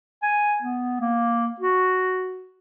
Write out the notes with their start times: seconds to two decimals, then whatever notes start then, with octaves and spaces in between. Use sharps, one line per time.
0.22 G#5
0.62 B3
1.00 A#3
1.60 F#4